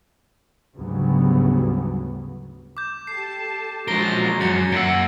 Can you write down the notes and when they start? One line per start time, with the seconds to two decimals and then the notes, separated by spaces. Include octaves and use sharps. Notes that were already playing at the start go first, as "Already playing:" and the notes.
0.75 D2 G#2 C#3 F#3 G3 B3
2.77 D6 G6
3.07 G4 A4 A5 C7
3.88 F3 F#3 G#3 C#4 A#4 A#6 C7 G7
4.40 F#2 A6 C#7
4.72 F#2 A#3 F#5 E6 G#6 D7